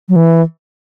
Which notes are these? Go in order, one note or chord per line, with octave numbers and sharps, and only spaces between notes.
F#3
E3